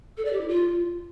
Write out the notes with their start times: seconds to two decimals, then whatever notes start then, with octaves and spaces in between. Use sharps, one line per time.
0.17 A4
0.25 D5
0.33 G4
0.41 E4
0.48 F4